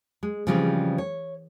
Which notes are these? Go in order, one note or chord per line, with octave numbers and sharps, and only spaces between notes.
G#3
C#3 E3 F3 G3 G#3 C4
C#5